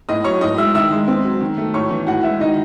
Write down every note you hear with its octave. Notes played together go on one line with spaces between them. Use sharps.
A2 D#5 D#6
F#3 C#5 C#6
A2 D#5 D#6
G#3 E5 E6
D#3 E5 E6
G#3
C4
F#3
D#3
A3
A2 C#5 C#6
E3
A2 F#4 F#5
G#3 E4 E5
D#3 D#4 D#5